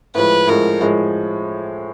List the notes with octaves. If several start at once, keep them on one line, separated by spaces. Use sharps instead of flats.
A2 F3 G#3 B4
A2 F3 G#3 A#4
A2 F3 G#3